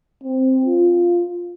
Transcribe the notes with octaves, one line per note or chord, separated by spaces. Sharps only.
C4
F4